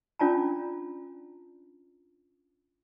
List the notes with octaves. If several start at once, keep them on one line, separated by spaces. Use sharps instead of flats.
C#4 D4 F4 D5 A5 A#5